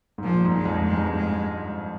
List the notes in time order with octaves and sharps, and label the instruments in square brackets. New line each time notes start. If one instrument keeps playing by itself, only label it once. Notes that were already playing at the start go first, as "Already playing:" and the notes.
[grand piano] G#2
[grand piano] A#2 [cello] F3
[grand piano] G#2
[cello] G#3
[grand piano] F2
[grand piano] G2 [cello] G#3
[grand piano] G#2
G2
[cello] G#3